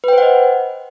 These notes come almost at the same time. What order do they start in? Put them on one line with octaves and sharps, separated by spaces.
B4 G5 C5 F#5 D#5